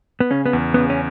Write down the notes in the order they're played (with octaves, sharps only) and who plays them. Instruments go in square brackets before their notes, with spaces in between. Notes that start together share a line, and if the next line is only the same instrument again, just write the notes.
[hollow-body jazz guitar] B3
[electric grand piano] C#3 [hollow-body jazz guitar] C#4
[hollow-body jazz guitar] B3
[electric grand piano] E2
[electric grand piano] C#3 [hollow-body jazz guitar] B3
[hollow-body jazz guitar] C#4